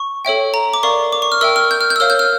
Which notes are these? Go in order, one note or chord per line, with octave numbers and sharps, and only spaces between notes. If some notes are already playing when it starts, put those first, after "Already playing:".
Already playing: C#6
A4 C#5 E5 G5
A#5
D6
A#4 D5 F5 C#6
D6
C#6
F6
A#4 E5 G5 E6
F6
G6
F6
G6
E6
A#4 C#5 F5 F6
G6
F6